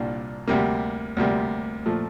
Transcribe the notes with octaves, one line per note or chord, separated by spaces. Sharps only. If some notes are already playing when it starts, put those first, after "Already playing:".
Already playing: C2 A#2 G3 D4 F4
D2 C3 G3 A#3
D2 C3 G3 A#3
A#2 F3 A3